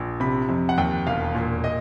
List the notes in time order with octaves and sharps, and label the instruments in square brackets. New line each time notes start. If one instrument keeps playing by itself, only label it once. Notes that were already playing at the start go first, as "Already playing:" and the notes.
Already playing: [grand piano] A#1
C3 B5
F2
F#5
D#2 G5
E1 F5
A#2
D#5